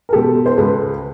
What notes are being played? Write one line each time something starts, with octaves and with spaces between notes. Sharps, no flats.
A#4
B2 G#3 G4 A4
C5
C#2 A4 B4